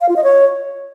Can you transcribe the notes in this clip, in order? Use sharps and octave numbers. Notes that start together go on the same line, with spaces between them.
F5
F4
D#5
C#5